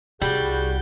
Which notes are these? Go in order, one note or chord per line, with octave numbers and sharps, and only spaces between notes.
C2 G3 F#4 G#4 G6